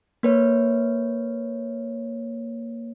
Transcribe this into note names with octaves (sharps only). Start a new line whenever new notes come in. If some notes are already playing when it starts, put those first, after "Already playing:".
A#3 B4 C#5